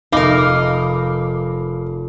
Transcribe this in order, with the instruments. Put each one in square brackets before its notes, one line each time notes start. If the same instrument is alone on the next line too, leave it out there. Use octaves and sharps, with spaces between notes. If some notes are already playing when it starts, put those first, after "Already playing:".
[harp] F1 B5 [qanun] D#4 A#4 [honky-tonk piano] F5 D6